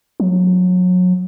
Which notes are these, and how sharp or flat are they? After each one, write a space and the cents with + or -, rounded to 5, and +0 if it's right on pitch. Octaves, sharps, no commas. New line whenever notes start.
F#3 -30